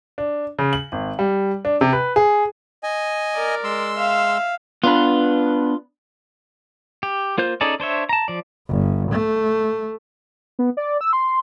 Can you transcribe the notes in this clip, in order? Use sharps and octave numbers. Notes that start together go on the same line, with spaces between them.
D4
C#3
F#7
G#1
G3
D4
C3
B4
G#4
D#5 G#5
A#4 D5
G#3 C6 E6
E5 F5
B3 D4 F4 B4
G4
A#3 F4 C5 G6
C#4 D#4 G#4 A4 D5
D4 C5 C#5 E5
A5 A#5
F3 D5
G1
A3
B3
D5
E6
C6